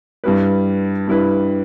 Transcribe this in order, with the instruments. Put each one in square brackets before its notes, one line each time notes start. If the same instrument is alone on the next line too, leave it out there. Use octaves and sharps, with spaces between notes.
[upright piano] G2 G3 E4 B4
G2 G3 E4 B4